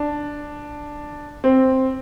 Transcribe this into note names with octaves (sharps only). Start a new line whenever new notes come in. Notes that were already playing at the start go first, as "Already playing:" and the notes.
Already playing: D4
C4